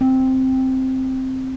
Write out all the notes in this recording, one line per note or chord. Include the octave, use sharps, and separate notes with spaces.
C4